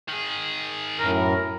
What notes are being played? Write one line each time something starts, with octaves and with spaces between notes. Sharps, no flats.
D#3 G#4
F#2 A2 A#4